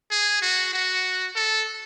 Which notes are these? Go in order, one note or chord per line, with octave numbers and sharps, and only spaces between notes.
G#4
F#4
F#4
A4